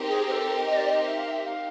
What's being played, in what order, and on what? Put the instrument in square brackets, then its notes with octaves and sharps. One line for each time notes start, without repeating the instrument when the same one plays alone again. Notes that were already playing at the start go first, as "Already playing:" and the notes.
Already playing: [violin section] C4 D#4 G4 A#4
[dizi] G#4
C5
A4
D#5
D5
D#5
E5
F5
E5
F5